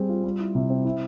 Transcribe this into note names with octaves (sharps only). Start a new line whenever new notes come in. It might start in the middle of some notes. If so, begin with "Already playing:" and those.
Already playing: G3 C4 G#4
F4
G3
E4
C3
C4
E4